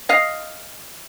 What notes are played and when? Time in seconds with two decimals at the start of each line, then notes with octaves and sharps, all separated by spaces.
0.09 D#5 F5